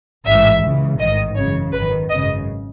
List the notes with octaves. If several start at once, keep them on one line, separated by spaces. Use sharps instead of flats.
A1 G#2 E3 E5
C#2 C#3 E3
A1 G#2 D#3 D#5
G#1 F#2 C#3 E3 C#5
G#1 F#2 D#3 B4
G#1 F#2 C#3 D#5